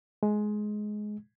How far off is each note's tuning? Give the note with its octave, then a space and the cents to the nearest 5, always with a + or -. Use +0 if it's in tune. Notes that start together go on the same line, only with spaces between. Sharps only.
G#3 +15